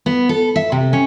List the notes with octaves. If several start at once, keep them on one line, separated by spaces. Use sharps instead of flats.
B3
A4
E5
C3
C#4